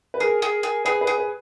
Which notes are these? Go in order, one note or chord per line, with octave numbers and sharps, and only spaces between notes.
B4
G#4 A#4
G#4
G#4
G#4 B4
B4
G#4
B4